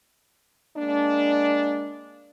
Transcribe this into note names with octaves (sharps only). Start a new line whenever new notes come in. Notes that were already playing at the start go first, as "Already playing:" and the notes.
G#3 A#3 D4